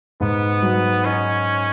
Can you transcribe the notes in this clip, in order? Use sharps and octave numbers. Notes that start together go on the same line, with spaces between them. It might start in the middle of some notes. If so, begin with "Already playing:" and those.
G#2 B3
F#3
C#4 D#4